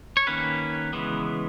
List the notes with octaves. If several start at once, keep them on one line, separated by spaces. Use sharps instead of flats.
C#5
D#3 A#3 C#4 B4
C#3 E3 G#3 B3